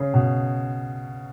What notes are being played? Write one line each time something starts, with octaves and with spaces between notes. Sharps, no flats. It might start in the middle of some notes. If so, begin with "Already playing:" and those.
Already playing: C#3
B2